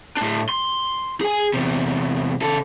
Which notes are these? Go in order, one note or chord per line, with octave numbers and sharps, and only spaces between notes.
A2 D4
C6
G#4 G#5
E2 C3
C#3 A4